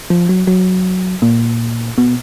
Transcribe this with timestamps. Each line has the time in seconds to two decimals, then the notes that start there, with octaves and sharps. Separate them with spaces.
0.10 F3
0.29 F#3
0.47 F#3
1.22 A#2
1.98 B2